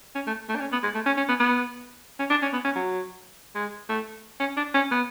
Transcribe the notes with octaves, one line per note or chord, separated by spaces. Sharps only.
C#4
A3
A3
D4
C#4
B3
G#3
A3
C#4
C#4
B3
B3
C#4
D4
C#4
B3
C#4
F#3
G#3
A3
C#4
D4
C#4
B3